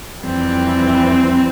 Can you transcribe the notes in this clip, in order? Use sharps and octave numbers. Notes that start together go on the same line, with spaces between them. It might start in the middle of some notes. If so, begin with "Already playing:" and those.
F2 E3 G3 C4